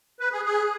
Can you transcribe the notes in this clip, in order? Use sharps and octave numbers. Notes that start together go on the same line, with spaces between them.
B4
G#4
G#4